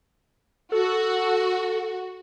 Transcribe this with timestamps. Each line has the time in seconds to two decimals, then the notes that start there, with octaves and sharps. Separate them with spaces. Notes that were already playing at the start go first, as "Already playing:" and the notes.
0.72 F#4 A4